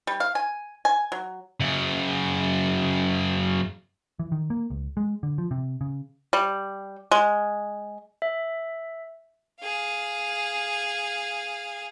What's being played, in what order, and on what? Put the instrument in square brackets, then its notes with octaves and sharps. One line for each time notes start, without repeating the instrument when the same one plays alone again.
[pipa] G3
F5
G#5
G#5
F#3
[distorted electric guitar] F#2 C#3
[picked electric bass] E3
D#3
A#3
C#2
G#3
D3
F3
C3
C#3
[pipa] G3
G#3
[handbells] E5
[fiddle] G#4 F5